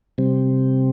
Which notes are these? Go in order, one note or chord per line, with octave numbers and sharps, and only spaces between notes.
C3 G3 C4